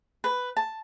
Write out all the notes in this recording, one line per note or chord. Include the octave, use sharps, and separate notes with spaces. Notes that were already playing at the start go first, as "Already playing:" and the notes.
B4
A5